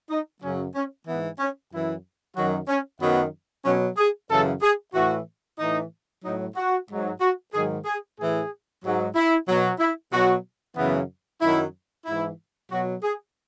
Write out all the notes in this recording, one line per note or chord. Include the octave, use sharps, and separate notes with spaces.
D#4
F#2 C#3 F#3 C#4
C#4
G#2 E3 B3
C#4
F#2 E3 E4
F#2 D#3 F#3 F#4
C#4
F#2 D#3 F#3 B3
B2 F#3 C#4
G#4
F#2 C#3 E3 A4
G#4
A2 E3 F#4
A2 E3 D#4
A2 F#3 D#4
F#4
G#2 F#3
F#4
G#2 D#3 F#3 G#4
G#4
A2 E3 G#4
G#2 F#3
E4
B2 F#3
E4
B2 F#3 F#4
F#2 C#3 E3 B3
F#2 D#3 F#3 E4
G#2 E3 E4
B2 F#3 F#4
G#4